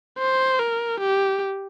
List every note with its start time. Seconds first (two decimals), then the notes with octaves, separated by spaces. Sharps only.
0.19 C5
0.59 A#4
1.00 G4